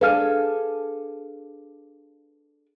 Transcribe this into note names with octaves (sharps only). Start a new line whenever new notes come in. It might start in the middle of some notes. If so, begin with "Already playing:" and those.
D4 G#4 A4 B4 F5 F6